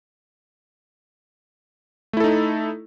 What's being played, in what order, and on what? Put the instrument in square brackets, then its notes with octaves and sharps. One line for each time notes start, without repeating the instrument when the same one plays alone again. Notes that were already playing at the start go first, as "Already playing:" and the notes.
[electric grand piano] A3
E4
A4
D#4